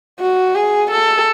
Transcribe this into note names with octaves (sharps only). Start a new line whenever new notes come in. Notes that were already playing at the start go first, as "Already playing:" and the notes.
F#4
G#4
A4